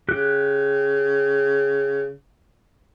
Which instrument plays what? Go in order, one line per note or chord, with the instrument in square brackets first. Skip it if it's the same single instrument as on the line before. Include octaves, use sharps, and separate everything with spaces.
[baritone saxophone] C#3 [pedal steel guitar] G4 F#6